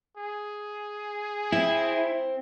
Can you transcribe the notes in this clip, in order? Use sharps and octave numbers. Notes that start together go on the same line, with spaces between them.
G#4
C4 E4